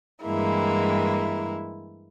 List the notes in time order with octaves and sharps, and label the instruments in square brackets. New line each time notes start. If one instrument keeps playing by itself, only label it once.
[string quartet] G2 E3 G#3 A#3 E4